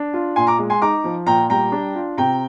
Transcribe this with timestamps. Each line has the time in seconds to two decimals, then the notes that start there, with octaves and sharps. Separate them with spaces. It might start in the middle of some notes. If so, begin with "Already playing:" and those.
Already playing: D4
0.14 F4
0.36 A#2 G#5 C6
0.47 A#5 D6
0.58 G#3
0.70 G#5 C6
0.82 D#4 A#5 D6
1.04 F3
1.26 A#2 G5 A#5
1.50 G3 G5 A#5
1.72 D4
1.95 F4
2.17 C3 G5 A#5